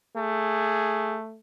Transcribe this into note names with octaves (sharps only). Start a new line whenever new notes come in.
A3 G#4